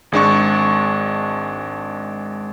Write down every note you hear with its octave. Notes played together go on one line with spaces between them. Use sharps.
G#1 G#3 D4 C#6